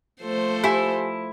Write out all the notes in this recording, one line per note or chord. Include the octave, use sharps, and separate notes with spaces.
F3 A3 A4 C5
E4 G4 G#5